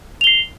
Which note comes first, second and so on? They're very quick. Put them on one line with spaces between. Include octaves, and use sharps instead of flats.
F7 G7 C7